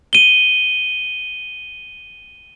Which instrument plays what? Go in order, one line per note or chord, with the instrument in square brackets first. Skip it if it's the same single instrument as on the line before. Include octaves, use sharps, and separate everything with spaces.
[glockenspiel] D#7 G7